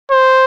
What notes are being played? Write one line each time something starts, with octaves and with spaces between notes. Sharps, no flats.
C5